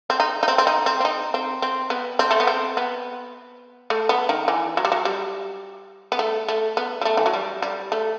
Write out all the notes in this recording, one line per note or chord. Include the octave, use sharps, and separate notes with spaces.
C4
D#4
D#4
C4
C4
D#4
C4
C4
D#4
C4
C4
B3
C4
A3
B3
C4
B3
A3
B3
D#3
E3
F#3
G3
F#3
G3
B3
A3
A3
B3
G3
A3
E3
F#3
G3
G3
A3